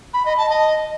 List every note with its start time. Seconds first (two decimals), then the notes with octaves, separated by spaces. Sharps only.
0.14 B5
0.26 D#5
0.37 A5
0.49 D#5